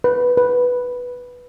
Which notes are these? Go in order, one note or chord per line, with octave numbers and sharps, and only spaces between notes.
B4
B4